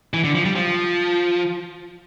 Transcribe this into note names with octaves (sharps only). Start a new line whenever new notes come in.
E3
D3
F3
G3
F3